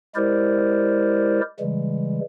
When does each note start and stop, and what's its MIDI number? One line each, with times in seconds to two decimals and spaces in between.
0.15 1.41 56
0.15 1.41 64
0.15 1.41 67
0.15 1.41 70
0.15 1.41 72
0.15 1.41 74
1.60 2.20 49
1.60 2.20 52
1.60 2.20 55
1.60 2.20 56